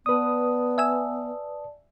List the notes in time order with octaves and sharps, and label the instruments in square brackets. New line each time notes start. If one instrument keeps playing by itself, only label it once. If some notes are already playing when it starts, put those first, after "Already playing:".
[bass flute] B3 [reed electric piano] B4 D#6 [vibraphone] D5 A5
[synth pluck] E5 G#5 E6